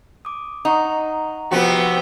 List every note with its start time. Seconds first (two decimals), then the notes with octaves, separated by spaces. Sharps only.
0.25 D6 D#6
0.65 D#4 F#5 A#5 C#6
1.51 C3 F3 B3 F#4 G5